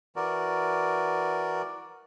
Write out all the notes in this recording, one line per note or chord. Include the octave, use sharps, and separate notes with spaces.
E3 F#4 A#4 D5